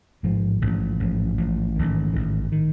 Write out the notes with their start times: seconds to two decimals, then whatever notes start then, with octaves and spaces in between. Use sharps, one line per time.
0.23 A1 G#2 F3
0.62 A1 G#2 F3
1.00 A1 G#2 F3
1.38 A1 G#2 F3
1.76 A1 G#2 D#3
2.13 A1 G#2 D#3
2.52 D#3